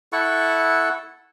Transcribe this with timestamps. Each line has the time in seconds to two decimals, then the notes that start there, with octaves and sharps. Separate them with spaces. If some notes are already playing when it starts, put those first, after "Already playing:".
0.12 E4 A4 F#5 C#6